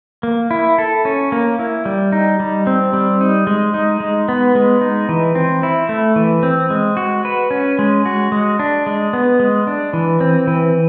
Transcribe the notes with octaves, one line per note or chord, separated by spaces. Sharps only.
A#3
E4
A4
C#4
A#3
E4
G3
D#4
G3
C4
G3
D#4
G#3
D#4
G#3
B3
G#3
D#4
E3
C4
E4
A3
E3
C4
G#3
F#4
B4
C#4
G#3
F#4
G#3
D4
G#3
B3
G#3
D4
E3
C4
E3